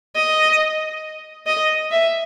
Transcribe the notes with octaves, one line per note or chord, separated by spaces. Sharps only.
D#5
D#5
E5